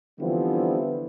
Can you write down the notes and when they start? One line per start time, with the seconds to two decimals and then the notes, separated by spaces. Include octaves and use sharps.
0.19 D3 E3 F3 G3 B3 C4